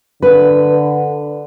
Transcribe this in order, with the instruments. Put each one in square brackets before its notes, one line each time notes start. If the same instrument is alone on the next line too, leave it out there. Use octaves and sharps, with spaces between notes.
[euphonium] D3 [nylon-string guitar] B4